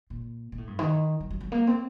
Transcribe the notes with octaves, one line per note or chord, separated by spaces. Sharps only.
A#2
A#2
A2
G2
D#3
F#3
F#3
F#3
A#3
C4